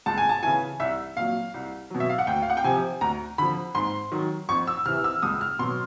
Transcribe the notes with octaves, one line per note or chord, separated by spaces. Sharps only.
C#2 A5
G#5
A5
C#3 E3 G#5
C2 E5
A#2 F#3 F5
C2
B2 F#3
E5
F5
F#5
D2 G5
F5
F#5
G5
C3 F3 G#5
D2 A#5
D3 F3 B5
G#2 C6
D#3 F#3
F2 C#6
E6
C3 E3 F6
E6
C#2 D#6
F6
B2 F#3 C6